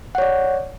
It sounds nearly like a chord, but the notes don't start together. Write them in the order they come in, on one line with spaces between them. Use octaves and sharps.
F#5 C#5 D5